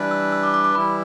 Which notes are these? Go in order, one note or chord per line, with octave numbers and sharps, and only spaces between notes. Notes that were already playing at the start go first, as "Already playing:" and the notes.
Already playing: E3 G3 D4 B4
E6
E6
D6
D6
D6
E3 G3 E4 B5